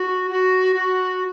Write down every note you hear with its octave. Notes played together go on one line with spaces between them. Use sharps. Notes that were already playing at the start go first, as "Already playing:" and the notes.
Already playing: F#4
F#4
F#4